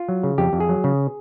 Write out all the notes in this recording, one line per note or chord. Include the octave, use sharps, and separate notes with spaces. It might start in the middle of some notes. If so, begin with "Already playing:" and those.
Already playing: F4
F#3
C#3
F2 G4
F2
G#4
F#3
C#3